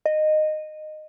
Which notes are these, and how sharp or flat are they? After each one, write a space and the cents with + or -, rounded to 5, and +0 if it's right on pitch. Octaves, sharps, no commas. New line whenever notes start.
D#5 -15